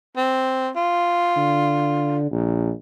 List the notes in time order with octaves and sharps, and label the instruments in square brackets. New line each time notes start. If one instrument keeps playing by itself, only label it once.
[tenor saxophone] C4
F4
[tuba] D3
A#1